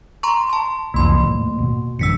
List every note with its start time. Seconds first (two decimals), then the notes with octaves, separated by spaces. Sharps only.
0.23 A#5 C6 C#6
0.50 A5 C6
0.94 C2 F2 E3 A#3 C6
1.21 D#2 A2
1.58 B2
1.99 A1 F#2 D3 E6 B6 C#7